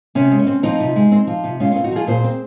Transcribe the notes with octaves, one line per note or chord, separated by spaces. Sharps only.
C3 C#4
G#3
C#4
C4
F3 C4 D#4
C3
G#3
C4
F3
C3
G#3 C#4 F4
C4 C#4 F4
D#4 F#4
F3 F4 G#4
A#2 G#4 C5
C4